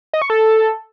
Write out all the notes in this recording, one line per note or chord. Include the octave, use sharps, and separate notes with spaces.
D#5
C#6
A4